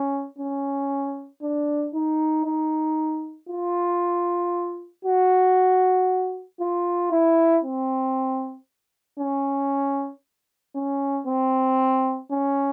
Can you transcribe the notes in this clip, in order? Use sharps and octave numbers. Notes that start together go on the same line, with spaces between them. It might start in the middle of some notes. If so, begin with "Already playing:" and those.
Already playing: C#4
C#4
D4
D#4
D#4
F4
F#4
F4
E4
C4
C#4
C#4
C4
C#4